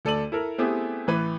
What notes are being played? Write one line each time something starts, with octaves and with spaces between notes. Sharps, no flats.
D2 A4 D5 D#7 F#7
E4 A4 A#4
A3 B3 C4 E4 G4 G#4
A1 E3 B4